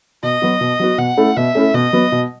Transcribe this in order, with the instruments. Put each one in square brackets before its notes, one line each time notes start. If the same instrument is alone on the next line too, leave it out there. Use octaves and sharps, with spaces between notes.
[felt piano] B2 [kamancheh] D#5
[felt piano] F#3 B3 F#4
B2
F#3 B3 F#4
[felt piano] B2 [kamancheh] F#5
[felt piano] A3 C#4 E4 A4
[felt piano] B2 [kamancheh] E5
[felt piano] A3 C#4 E4 A4
[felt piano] B2 [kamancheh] D#5
[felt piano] F#3 B3
B2